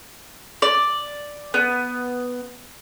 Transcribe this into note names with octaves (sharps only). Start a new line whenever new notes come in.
D5
B3